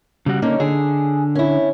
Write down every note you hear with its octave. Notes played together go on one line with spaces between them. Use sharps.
C#3 G3 F#4
D3 A#3 C#4 D#4
D3 G#4
C#4 E4